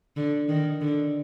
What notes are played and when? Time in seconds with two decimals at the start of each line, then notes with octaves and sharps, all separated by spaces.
0.16 D3
0.48 D#3
0.81 D3